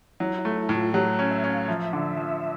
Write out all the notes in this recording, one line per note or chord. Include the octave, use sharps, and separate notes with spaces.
F#3 E4
E4
A3
E4
A2
F4
F#3 G4
C#4
E5
C#4
F5
F3 E5
D3
F3